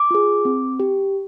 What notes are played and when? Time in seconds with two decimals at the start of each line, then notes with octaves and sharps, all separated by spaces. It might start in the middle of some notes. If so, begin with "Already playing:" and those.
Already playing: D6
0.11 F4 G#4
0.45 C4
0.80 G4